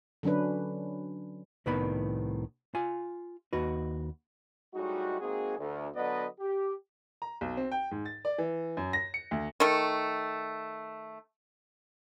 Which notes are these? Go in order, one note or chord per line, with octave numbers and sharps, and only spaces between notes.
D3 F#3 C#4 D4 B4
C2 A2 D#3 B3 B4 B5
F4 G#5
D#2 F#4 B4
A2 G3 G#3 D#4 F#4
G#3 A#3 C4 D#4 F#4 G#4
D2
D3 F#3 B3 B4 D5 D#5
G4
A#5
B1
C4
G5
G#2
A6
D5
E3
F#2
A#6
C#7
D2
D#3 A3